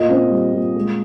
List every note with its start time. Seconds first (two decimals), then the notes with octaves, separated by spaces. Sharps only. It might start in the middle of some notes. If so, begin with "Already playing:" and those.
Already playing: A#2 D#5
0.09 C4
0.30 G3
0.53 A#2
0.75 G#3